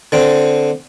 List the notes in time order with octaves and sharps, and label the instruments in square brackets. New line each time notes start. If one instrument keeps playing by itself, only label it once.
[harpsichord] D3 C4